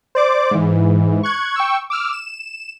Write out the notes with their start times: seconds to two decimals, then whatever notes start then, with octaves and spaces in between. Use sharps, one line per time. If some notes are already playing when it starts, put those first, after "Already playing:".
0.15 C5 D5 D6
0.51 G#2 E3
1.23 C#6 F#6 G#6
1.56 G5 C#6 E6
1.90 D6 E6 F6
2.13 E7